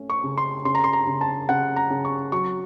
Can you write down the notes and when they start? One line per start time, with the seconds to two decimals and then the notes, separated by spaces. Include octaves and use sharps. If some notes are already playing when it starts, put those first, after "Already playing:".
Already playing: A3 C#4
0.10 C#6
0.24 C#3
0.38 C6
0.65 C#3 C6
0.75 A#5
0.84 C6
0.93 A#5
1.07 C#3
1.21 A5
1.49 C#3 F#5
1.76 A#5
1.90 C#3
2.05 C#6
2.32 F#3 C#6